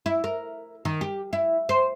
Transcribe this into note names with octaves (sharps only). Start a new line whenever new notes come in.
E4
A#4
D#3
G4
E4
C5